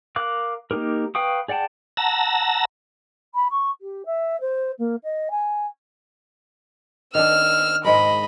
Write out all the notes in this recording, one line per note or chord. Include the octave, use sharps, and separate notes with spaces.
A#4 F5 D6 F#6
A#3 D4 D#4 G4 A#4
B4 F5 G5 C#6 D#6
G#4 D5 F#5 G5 A5
F#5 A5 A#5 E6 A#6
B5
C#6
G4
E5
C5
A#3
D#5
G#5
D#3 D4 E6 F6
G#2 G#3 A#4 D#5 B5